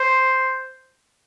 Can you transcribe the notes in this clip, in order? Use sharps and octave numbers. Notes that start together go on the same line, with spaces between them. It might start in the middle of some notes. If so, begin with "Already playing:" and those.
Already playing: C5